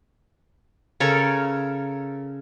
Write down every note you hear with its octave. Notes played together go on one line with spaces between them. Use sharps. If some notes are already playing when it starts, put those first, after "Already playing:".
C#3 A4 A#4 C#5